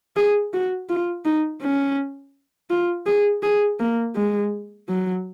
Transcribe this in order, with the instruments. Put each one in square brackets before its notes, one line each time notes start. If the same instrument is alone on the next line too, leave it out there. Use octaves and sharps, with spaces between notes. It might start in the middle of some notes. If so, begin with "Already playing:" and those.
[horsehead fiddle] G#4
F#4
F4
D#4
C#4
F4
G#4
G#4
A#3
G#3
F#3